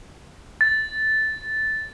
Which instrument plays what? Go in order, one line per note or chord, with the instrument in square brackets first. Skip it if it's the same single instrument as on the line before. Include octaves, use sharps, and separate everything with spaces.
[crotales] A6